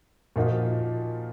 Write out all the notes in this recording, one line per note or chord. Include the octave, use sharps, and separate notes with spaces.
A#2 F3 A#3 D#4 F#4